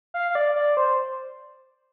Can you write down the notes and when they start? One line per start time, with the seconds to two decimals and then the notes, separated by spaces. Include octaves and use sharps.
0.14 F5
0.30 F5
0.35 D5
0.55 D5
0.77 C5